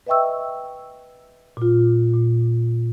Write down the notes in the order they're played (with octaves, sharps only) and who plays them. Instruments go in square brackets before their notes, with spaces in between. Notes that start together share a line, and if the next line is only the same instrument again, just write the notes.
[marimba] B4 D#5 E5 G5 C#6 E6
A#2 F4
A#2